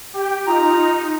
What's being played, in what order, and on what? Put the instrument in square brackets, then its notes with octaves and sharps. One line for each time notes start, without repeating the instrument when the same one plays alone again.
[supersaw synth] G4 G5
[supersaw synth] D#4 [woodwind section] F4 A#5